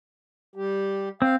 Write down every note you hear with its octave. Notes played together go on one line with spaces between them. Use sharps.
G3 G4
C4 F5